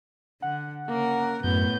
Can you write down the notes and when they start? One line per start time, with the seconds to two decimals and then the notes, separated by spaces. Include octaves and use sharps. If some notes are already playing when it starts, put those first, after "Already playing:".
0.42 D3 F#5
0.88 C#3 A#3 A#4
1.44 F#2 A2 B3 G6